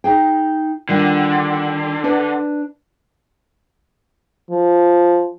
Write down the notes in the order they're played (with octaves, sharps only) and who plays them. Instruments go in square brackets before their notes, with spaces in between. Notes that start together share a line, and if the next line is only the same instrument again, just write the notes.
[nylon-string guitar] D#4 G#4 G5
[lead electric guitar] D3 [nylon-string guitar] D#3 G3 F4
[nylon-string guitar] D4 B4 D5
[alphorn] F3